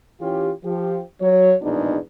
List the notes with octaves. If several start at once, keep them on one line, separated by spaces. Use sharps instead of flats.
E3 C#4 F4 G4
F3 G4
F#3 C#5
A#1 E2 G#2 B2 D4 D#4